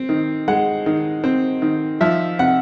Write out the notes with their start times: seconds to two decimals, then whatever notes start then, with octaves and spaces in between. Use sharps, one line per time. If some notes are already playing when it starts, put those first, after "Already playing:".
Already playing: C4
0.09 D#3
0.48 G#3 F#5
0.86 D#3
1.24 C4
1.62 D#3
2.01 F3 E5
2.39 C3 F#5